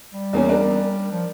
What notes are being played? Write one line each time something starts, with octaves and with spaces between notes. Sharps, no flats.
G3
E2 A#3 C#4
D4 A#4
F3